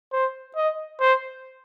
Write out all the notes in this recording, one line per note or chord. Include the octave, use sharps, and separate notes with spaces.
C5
D#5
C5